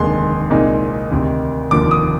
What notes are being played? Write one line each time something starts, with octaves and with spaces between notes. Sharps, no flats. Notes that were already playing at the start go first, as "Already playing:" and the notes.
Already playing: F1 D#2 D3 G#3 C6
C2 A#2 G#3 C4 D#4
D2 C3 D#3
F1 D#2 D3 F3 D6
D#6